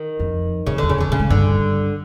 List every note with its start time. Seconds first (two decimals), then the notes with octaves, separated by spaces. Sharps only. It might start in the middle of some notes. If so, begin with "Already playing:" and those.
Already playing: D#3
0.20 F2
0.67 F2 C#3
0.78 E2 D3
0.90 C#3
0.98 F2 D3
1.09 G2 C#3
1.20 G#2
1.30 G2 D3